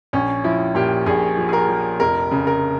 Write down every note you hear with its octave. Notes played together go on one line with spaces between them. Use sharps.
A#1 C#4
F3 E4
A#2 G4
A#1 G#4
F3
G#4
A#4
F3
F1 A#4
C#3
A#4